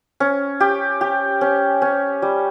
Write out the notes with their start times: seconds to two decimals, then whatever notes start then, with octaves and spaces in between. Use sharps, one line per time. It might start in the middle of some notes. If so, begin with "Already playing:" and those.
0.20 C#4
0.60 G4
1.01 G4
1.41 C#4
1.82 C#4
2.22 G3